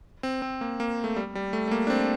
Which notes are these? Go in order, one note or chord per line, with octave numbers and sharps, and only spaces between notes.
C4
C4
A#3
A#3
A3
G3
G3
A3
A3
A#3
D4
C4